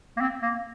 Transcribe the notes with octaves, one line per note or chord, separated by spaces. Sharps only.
A#3
C4
A#3